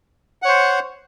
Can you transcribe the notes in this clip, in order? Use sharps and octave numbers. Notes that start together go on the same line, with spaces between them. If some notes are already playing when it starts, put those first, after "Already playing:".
C5 C#5 F#5